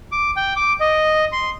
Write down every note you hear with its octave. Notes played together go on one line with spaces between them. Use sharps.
D6
G5
D6
D#5
C6